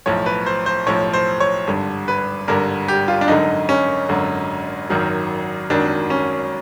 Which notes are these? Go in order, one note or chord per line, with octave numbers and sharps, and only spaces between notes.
B1 A2 F3 C#5
B4
C5
C5
B1 A2 F3 C#5
C5
C#5
G#1 G2 D3
B4
G#1 G2 D3 A#4
G4
F4
D4
G#1 F#2 D3 D#4
C#4
G#1 F#2 D3
G#1 F#2 D#3 F#3
G#1 F#2 D#3 F#3 D4
C#4